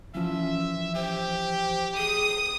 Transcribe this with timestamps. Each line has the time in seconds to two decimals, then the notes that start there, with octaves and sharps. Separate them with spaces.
0.15 E3 F3 C#4 E5
0.95 G4 C5
1.97 G#4 D#6